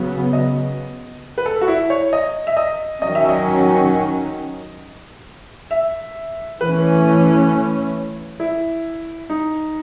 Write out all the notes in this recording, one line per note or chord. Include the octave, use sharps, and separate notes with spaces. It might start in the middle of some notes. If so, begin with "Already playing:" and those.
Already playing: C#3 F#3 B3
D#5
B4
A4
F#4
E4
C#5
D#5
E5
D#5
D#3 F#3 C#4 D#5
E5
D#5
E5
E3 A3 C#4 B4
E4
D#4